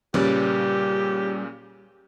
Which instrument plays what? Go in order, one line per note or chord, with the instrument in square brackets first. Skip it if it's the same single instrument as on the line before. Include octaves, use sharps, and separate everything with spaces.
[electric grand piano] A#2 C#3 C#4 [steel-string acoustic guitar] G3 B4 D5 [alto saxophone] G4